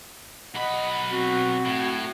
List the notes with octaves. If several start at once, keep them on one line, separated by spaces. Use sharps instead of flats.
B1 D#5 F#5 B5
C4 F#4
A2